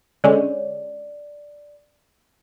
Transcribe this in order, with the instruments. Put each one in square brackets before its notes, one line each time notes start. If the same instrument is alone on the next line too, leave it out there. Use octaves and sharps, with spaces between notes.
[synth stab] D3 G#3 C#4 [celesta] D5